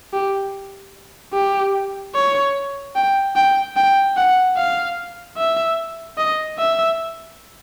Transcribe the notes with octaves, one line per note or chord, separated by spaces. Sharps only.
G4
G4
C#5
G5
G5
G5
F#5
F5
E5
D#5
E5